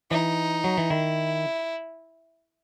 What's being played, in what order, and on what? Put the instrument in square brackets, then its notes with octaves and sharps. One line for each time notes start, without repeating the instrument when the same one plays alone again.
[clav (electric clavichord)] E3 [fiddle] D#4
[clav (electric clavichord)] F#3
E3
[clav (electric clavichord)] D#3 [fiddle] E4